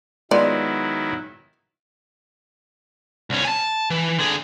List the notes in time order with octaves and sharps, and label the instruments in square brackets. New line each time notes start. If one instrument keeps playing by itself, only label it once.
[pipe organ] D#3 F#3 E4 [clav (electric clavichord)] G#3 B3 F#5 [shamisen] F4 D5
[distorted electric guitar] C2 C#4
G#5 A5
E3
D3 G#4